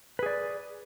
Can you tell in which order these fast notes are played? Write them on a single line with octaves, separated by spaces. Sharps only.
B4 G#4 D5